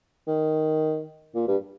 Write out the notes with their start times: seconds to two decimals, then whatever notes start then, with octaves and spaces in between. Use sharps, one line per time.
0.28 D#3
1.35 A#2
1.48 G2